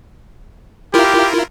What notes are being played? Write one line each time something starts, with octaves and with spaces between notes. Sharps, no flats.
E4 F4 G4 A#4